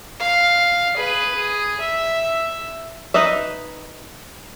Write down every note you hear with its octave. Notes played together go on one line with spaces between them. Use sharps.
F5
G#4 B4
G#4
E5
D#4 B4 D#5 E5